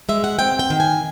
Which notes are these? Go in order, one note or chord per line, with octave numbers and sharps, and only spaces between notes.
G#3 E5
F#5
C4 G5
G5
D#3
G#5